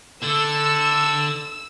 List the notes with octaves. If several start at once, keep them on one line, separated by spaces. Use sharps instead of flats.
D3 A4 E6